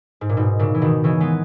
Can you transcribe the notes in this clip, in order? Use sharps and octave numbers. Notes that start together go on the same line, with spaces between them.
G#2
A#2
G#2 B2
A#2 C#3
E3
B2 D#3
C#3 E3
G#3 B3